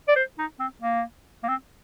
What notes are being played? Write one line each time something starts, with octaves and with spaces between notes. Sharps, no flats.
D5
C5
D#4
C4
A#3
A#3
C4